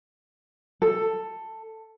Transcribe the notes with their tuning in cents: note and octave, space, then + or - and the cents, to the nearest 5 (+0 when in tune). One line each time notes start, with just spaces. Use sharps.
A4 +10